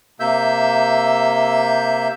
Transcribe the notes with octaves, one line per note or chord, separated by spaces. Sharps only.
C3 A#3 E5 E6 G6